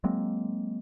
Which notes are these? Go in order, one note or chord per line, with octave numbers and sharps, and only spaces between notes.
F#3 G#3 A#3 C4